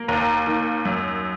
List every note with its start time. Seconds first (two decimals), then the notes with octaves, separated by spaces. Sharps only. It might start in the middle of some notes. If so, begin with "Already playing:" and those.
Already playing: A#3
0.08 D#2 A#5
0.47 D#3
0.85 F#2